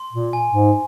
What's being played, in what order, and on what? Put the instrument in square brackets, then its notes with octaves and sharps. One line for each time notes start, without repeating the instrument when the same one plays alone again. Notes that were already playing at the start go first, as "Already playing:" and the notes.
Already playing: [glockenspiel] C6
[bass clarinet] A#2
[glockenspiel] G#5
[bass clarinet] G#2